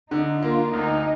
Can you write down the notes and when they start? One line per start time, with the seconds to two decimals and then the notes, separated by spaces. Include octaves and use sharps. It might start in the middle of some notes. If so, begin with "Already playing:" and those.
0.11 D3 D#4
0.43 A#3 F4
0.73 D2 D#4